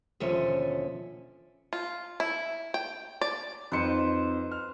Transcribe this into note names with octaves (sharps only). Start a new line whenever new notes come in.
D#2 B2 D3 F3 C#4 E5
F4
E4
G5
D5
F2 D#4 B4 C5 C#7
F6